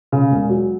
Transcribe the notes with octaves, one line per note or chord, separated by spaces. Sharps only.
C#3
E1
F#3